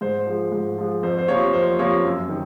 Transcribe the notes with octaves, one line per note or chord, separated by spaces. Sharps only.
G#2 C5
C5
F3 G#3
G#2
F3 G#3
F2 C5
C5
C3 F3 A#3 C#5
F2 C5
C3 F3 A#3 C#5
F#2
D#3